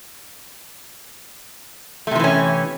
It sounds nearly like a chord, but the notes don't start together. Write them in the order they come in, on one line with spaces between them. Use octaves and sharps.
A3 C3 F3 E3 C#4